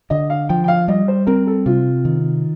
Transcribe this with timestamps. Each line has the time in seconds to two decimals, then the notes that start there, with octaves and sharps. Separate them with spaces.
0.10 D3 D#5
0.30 F5
0.49 F3 G5
0.64 G5
0.68 F5
0.88 G3 D#5
1.08 C5
1.27 C4 A#4
1.47 A4
1.66 C3 F4
2.05 D#3